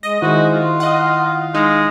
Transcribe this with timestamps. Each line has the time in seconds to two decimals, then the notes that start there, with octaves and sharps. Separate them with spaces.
0.03 G#3 D#5
0.22 D#3 G#3 E4 F#4 C5
0.53 F4
0.80 D#5 F5 F#5
1.54 G#3 D#4